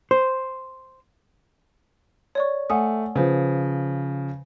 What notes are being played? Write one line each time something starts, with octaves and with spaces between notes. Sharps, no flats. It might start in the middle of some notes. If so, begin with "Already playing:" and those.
C5
C#5 D5 C#6
A3 F#5 G#5 D#6
C#3 F3 B4 C5